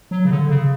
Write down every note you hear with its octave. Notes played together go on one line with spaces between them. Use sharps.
F#3
C#3
D3
C#3